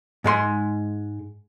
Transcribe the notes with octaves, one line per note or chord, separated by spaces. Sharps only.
G#2 G#3 B4 C6